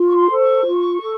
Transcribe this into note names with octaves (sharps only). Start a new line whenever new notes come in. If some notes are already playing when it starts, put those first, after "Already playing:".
Already playing: F4
C#6
C6
A4 C5
C#6
F4
A4